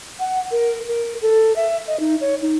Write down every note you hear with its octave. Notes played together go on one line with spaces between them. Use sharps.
F#5
A#4
A#4
A4
E5
D#5
D#4
C#5
D#4